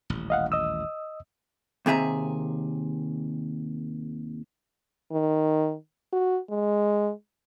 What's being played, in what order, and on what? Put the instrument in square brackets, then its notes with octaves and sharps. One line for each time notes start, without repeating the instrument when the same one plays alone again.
[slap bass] D#1 A1
[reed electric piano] D#5 F5 F#5
D#5 D#6 E6
[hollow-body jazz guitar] D#2 C3 G#4 E5 A#5
[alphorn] D#3
F#4
G#3